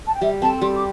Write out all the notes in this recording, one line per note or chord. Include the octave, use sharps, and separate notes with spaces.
A5
G5
G3 E5
C4 A4 A5
G3 C6
D6